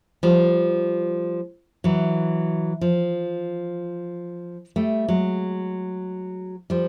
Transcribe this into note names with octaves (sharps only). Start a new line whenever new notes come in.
F3 G3
E3 F#3
F3
G3 A3
F#3 G#3
F3 G3